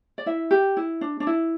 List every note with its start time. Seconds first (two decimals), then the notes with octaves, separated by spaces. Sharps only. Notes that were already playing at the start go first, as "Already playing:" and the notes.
0.18 D5
0.26 E4 E5
0.51 G4
0.77 E4
1.01 D4
1.20 D4
1.27 E4